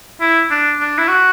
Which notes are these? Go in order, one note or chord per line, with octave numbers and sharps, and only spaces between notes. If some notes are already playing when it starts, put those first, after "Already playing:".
E4
D4
D4
E4
F#4